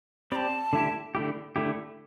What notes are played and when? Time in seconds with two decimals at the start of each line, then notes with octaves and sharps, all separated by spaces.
0.31 C4 G4 D5 A5 B5
0.73 D3 A3 E4 G4
1.15 D3 A3 E4 G4
1.56 D3 A3 E4 G4